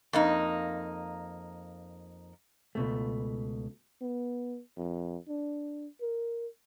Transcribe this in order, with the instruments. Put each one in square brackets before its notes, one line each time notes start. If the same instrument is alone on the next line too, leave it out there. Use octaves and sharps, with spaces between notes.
[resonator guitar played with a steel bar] F2 A#3 D#4
[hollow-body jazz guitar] C#2 B2 A3
[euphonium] B3
F2
D4
A#4